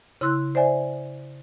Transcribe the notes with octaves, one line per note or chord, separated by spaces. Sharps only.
C#3 E4 C6 E6 F#6
C5 D5 E5 G#5